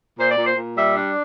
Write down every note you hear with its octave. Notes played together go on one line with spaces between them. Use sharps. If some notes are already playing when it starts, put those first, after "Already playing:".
A#2 C5
D5
A#2
C5
A#2
G3 E5
D4